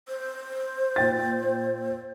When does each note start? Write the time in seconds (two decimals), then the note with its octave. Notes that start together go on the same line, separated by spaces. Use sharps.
0.08 C5
0.96 A#2 G5 A6